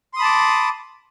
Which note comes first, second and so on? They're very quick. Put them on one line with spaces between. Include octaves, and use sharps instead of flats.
C6 D#6 B5 A5 D6